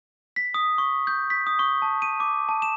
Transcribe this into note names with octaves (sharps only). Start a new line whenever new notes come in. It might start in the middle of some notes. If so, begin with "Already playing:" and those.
B6
D#6
C#6
G6
B6
D#6
C#6
A5
D#7
D6
A5
E7